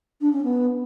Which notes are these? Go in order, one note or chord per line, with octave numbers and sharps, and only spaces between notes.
D4
C#4
B3